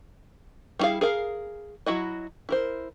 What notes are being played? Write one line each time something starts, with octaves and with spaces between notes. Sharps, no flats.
G3 C#4 E4 G#4 F5
G#4 A#4 F5
F#3 E4 F#4 D#5
E4 A#4 C5